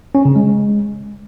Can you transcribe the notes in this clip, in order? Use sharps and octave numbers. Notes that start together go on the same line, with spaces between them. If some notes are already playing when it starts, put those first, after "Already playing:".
C#4
C#3
G#3